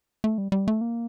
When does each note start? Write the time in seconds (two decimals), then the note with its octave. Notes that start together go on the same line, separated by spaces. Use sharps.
0.24 A3
0.38 G3
0.52 G3
0.68 A3
0.81 A#3